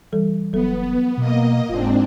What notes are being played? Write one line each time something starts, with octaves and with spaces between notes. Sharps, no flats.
E3 G3 A4
F1 F#3 B3 A4
B2 A#3 D#5
F1 G#2 C4 D4 F4